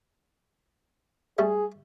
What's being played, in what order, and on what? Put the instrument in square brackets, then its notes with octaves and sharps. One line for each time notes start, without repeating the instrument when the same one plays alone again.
[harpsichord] G3 A3 [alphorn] G#4